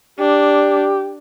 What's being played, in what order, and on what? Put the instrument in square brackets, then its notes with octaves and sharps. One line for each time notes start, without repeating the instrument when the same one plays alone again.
[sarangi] D4 [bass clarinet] G4